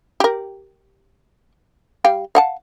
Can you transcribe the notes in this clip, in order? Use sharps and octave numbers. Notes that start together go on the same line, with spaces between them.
G4 A#4
G3 F5 G5
F5 F#5 A5